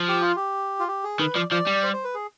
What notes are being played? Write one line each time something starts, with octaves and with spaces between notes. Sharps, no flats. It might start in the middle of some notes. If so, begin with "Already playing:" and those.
Already playing: F3
G4
F4
G4
F4
G4
G#4
D#3 B4
F3 D5
F3 D5
G3
C5
C5
B4
G#4